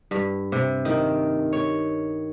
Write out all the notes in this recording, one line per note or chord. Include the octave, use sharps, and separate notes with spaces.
G2
C3
D#3
C#5